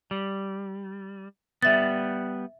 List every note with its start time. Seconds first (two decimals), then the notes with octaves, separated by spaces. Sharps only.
0.11 G3
1.62 G3 B3 E5 A6